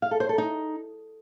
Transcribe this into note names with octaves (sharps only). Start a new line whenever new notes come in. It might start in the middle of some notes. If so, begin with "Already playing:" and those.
F5
A4
C5
A4
D#4